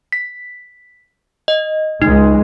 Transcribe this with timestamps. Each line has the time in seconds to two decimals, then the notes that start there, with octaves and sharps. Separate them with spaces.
0.12 B6
1.48 D#5
2.02 C#2 G#3 D#4